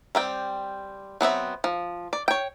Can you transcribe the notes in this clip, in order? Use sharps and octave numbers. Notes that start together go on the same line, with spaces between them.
G3 C4 G5
F#3 B3 C4 E5
F3
D5
C#5 G5